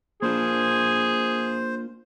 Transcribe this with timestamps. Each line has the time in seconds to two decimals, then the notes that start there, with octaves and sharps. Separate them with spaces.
0.22 A#3 D4 F4 G#4 C5